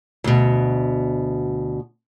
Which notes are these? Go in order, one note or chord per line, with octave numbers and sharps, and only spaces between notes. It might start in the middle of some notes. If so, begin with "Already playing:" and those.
D2 B2